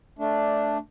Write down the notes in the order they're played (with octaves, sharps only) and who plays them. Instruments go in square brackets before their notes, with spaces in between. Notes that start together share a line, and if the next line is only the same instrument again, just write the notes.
[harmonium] A3 D4